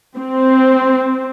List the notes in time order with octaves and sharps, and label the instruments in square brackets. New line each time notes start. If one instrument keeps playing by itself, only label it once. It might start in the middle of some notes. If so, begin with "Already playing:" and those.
[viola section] C4